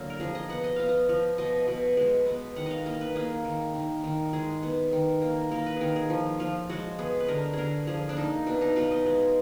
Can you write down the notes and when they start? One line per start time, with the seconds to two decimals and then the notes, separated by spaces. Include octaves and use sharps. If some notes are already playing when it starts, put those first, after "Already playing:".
Already playing: D3 F#3 A#3 F4
0.10 A#4
0.20 F3 G#4
0.35 D#5
0.49 B3 F#5
0.64 D#5
0.76 B3 F5
0.89 D#5
1.09 F3
1.38 B2 D#5
1.68 B2
1.97 G#3
2.26 B3
2.56 D#3 F#5
2.66 D#5 F5
2.86 A#3 D#5
3.01 B4
3.16 A#3 G#4
3.45 D#3
3.74 D#3
4.04 D#3
4.33 G#3 G#4
4.63 B3
4.92 D#3
5.22 A#3
5.51 A#3 A#4
5.66 B4
5.77 D#3 G#4 A#4
5.96 G#4
6.10 F3
6.40 F3 F4
6.69 G#3 F#4
6.99 B3 G#4
7.20 B4
7.28 D3 A#4
7.53 D3 G#4 A#4
7.87 F3 G#4
8.09 D4
8.17 A#3 D#4
8.46 B2 D4
8.61 D#4
8.76 B2 F4
8.91 D#5
9.06 G#3